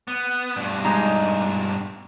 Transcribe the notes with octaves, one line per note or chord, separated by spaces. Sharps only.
B3
G2 B2
G#3 D#4 A#5